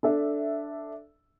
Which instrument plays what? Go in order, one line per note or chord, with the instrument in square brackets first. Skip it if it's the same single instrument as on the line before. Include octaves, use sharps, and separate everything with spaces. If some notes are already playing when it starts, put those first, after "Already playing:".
[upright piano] D4 A4 E5